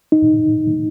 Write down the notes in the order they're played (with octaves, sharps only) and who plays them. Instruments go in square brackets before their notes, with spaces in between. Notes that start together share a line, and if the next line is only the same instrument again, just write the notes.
[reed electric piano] D#4